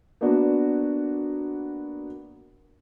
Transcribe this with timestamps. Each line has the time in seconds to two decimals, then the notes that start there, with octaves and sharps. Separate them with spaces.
0.21 A#3 B3 D4 F#4